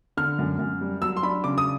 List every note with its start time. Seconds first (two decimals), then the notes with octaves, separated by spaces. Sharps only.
0.17 D3 F6
0.39 F#2
0.59 F#2
0.81 G3
1.02 F#3 E6
1.17 C6
1.22 D4 B5
1.44 C#3 D6
1.58 D#6